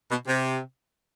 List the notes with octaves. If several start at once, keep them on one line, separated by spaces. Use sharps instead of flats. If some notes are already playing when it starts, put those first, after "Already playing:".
B2
C3